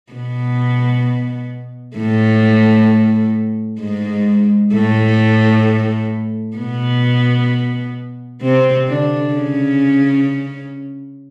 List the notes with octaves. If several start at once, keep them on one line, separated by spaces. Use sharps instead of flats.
B2 B3
A2 A3
G#2 G#3
A2 A3
B2 B3
C3 C4
D3 D4
C#3 C#4